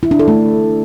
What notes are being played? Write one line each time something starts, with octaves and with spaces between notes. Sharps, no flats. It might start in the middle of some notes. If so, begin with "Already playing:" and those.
E4
D4
A4
A3